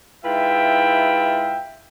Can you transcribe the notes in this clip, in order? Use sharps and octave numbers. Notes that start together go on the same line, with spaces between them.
G#2 E4 F4 B4 E5 G5